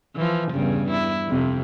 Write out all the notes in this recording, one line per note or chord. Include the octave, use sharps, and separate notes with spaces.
E3 F3
E2 G2 C#3
E4
F2 C3